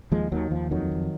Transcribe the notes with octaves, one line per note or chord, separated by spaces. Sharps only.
D#2 F3 G#3
D#2 D#3 F#3
D#2 F3
F2 D#3 F#3
F2